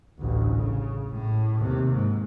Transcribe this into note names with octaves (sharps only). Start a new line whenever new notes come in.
A1 D2
C#3
A2
D#2 C3
G#2